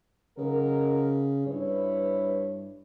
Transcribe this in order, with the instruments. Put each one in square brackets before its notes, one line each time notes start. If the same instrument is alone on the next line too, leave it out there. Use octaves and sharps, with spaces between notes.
[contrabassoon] C#3 [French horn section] F#3 D#4 A#4
[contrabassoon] G2 [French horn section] E4 B4 C#5